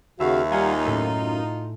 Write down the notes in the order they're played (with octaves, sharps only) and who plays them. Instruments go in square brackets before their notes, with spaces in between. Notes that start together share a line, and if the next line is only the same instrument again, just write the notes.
[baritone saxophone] D#2 [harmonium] C#3 F#4 F5 [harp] E5
[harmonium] G3 F5 F#5 [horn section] D#4 F4 [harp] G#5
[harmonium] F#2 [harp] A2 A3